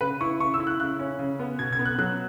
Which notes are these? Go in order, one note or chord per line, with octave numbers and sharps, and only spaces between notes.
C#3 B4
E4 C#6
C#3 C#6
E6
E4
F#6
C#3 F#6
C#4
C#3
B3
B2 G#6
G#6
B3
F#6
F#3 F#6